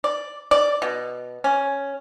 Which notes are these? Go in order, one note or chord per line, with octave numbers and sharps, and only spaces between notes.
D5
D5
B2
C#4